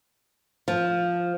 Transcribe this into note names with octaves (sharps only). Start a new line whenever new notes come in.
F3